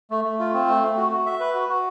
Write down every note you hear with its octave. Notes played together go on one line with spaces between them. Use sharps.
A3
A3
F4
C4
A3
A3
F#4
F#4
E5
B4
F#4
F#4